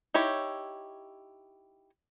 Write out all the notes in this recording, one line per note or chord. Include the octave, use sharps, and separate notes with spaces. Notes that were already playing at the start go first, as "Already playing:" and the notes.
D#4 E4 G4 C#5